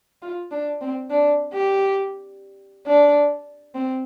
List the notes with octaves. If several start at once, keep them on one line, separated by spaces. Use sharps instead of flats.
F4
D4
C4
D4
G4
D4
C4